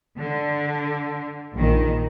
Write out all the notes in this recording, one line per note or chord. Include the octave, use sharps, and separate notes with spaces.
D3
A#1 D#3